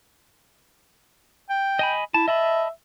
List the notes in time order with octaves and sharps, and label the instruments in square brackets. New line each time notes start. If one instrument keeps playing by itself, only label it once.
[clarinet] G5
[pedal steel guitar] D#5 G#5 B5
[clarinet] E4 [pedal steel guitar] A5
[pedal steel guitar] D#5 A5 B5 [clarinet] E5